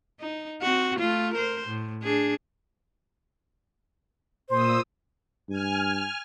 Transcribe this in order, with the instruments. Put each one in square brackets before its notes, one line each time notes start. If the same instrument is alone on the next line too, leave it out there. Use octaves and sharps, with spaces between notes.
[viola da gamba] D#4
C4 F#4
A3 F4
A#4 C5
A2
D4 G#4
[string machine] A#2 D#6 E6 [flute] C5
[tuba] G2 [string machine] G#5 F6